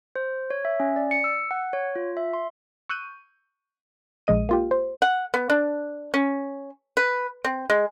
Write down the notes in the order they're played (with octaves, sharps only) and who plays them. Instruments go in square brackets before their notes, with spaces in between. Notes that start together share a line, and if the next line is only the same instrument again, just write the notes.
[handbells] C5
C#5
E5
C#4
D5
C#7
E6
F#5
C#5
F4
E5
C6
[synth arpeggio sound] C#6 E6 F#6 G6 D#7
A#1 G#3 D#5 D#7
A#3 F4 G4
C5
[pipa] F#5
B3
D4
C#4
B4
C4
G#3